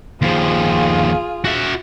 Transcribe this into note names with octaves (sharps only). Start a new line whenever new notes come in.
D#2 F3 F4 G#4
F#4 E5